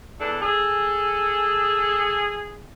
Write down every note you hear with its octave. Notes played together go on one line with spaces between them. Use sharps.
E2 D4 A4
G#4 A4